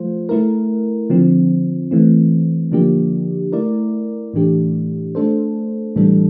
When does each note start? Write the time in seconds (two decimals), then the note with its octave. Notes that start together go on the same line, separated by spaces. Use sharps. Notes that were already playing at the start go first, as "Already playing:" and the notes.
Already playing: F3 A3 F4 C5
0.29 A3 E4 A#4
1.10 D3 F3 C4
1.91 E3 A3 C4
2.72 D3 F3 A#3 D4 G4
3.52 A3 E4 A#4 D5
4.34 A2 E3 A3 D4 G4
5.15 A3 D4 A4 C5
5.96 A2 E3 G3 D4 A4